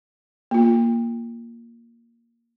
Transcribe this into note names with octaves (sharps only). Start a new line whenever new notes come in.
A#3 F4